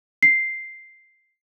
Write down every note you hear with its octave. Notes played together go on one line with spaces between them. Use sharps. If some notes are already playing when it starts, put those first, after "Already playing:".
C7